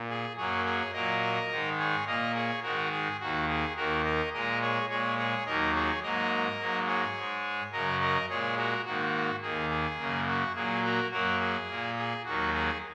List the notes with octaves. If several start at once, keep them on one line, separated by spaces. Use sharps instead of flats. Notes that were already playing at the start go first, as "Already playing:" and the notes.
Already playing: A#2
G#4
F#2 F#3 A#3 G#4 C#5
G#4 C#5
A#2 F#3 A#3 A#4 D#5
G#2 D#3 G#3
G#4 C#5
A#2 A#3 A#4 D#5
G#4 C#5
G#2 D#3 G#3 F#4 A#4
G#4
D#2 D#3 A#3 F#4
G#4
D#2 D#3 A#3 F#4 A#4
A#4 D#5
A#2 G#3 A#4 D#5
G#4 C#5
A#2 G#3 G#4 C#5
G#4 C#5
D#2 D#3 F#3 A#3 A#4 D#5
G#4 C#5
G#2 F#3 A#3 A#4 D#5
G#2 F#3 A#3
G#4 C#5
G#2 G#3
F#2 C#3 F#3 A#4 D#5
A#4 D#5
A#2 G#3 G#4 C#5
F#4 A#4
G#2 D#3 A#3 F#4
D#2 D#3 A#3 G#4
G#4
F#2 C#3 A#3
F#4
A#2 F#3 A#3 G#4
F#4 A#4
F#2 F#3 A#3 F#4 A#4
G#4
A#2 A#3
G#4
D#2 D#3 F#3 A#3 F#4
G#4